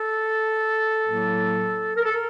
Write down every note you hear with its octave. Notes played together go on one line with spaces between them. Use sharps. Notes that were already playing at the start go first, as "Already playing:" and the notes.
Already playing: A4
A2 F#3 A#3
A#4
A4
A#4